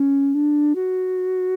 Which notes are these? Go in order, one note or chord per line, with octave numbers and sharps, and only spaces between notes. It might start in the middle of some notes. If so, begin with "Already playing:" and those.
Already playing: C#4
D4
F#4